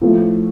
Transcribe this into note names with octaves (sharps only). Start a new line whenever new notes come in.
A2 F3 A3